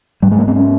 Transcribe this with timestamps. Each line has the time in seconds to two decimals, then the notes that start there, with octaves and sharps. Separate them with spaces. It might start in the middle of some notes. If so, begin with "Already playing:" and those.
0.22 G#2 G3
0.32 G#3
0.39 A#3
0.48 C4
0.56 C#4